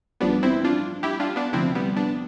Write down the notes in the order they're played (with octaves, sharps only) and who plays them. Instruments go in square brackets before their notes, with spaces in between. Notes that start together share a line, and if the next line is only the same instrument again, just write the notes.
[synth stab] A1 G2 F3 B3 D4
C4 E4
D4 F4
E4 G4
D4 F4
B3 D4
D2 C3 F3 C4 E4
G3 B3
B3 D4